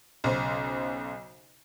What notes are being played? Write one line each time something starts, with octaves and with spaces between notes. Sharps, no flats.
B1 C#3 C5